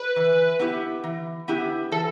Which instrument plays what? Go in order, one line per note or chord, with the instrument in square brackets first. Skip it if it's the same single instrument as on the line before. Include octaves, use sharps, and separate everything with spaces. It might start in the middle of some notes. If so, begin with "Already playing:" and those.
Already playing: [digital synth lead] B4
[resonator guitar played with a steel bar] E3
B3 E4 G4
E3
B3 E4 G4
[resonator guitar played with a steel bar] E3 [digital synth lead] A4